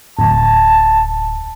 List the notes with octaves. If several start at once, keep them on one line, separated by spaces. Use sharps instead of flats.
D1 A5